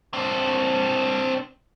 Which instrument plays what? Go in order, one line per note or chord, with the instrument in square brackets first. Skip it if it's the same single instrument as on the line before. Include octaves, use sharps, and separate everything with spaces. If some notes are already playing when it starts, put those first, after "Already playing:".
[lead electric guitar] C4 D4